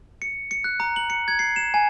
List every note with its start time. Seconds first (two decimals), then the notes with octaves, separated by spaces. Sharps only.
0.22 C#7
0.51 C#7
0.64 F#6
0.80 A#5
0.96 F#7
1.10 C#7
1.28 G#6
1.39 C7
1.56 E7
1.74 G#5